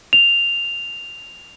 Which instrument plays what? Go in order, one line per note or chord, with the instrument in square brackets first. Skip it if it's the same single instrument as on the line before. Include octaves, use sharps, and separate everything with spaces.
[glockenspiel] F7